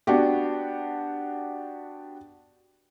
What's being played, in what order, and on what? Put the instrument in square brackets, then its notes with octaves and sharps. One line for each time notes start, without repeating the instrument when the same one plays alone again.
[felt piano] B3 D4 F#4 G4